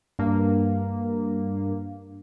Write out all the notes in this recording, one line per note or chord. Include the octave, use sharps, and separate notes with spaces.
G2 A#3